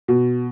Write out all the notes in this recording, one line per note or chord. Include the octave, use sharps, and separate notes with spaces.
B2